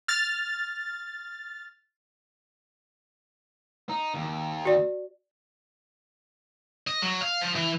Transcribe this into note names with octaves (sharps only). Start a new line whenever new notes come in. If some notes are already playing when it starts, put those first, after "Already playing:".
F6 A6
D#4
D#2
F#4 D5
D#5
F#3
F5
F3
E3